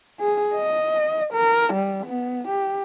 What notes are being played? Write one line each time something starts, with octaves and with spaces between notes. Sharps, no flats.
G#4
D#5
A#4
G3
B3
G4